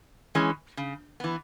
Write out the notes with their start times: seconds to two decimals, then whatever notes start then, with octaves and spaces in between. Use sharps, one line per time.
0.35 E3 G#3 C#4
0.77 C#3
1.20 E3 B3